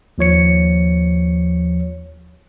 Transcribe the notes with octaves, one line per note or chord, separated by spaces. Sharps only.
D#2 F3 C#5 C#7